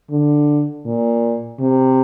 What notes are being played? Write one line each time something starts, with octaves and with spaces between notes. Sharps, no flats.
D3
A#2
C3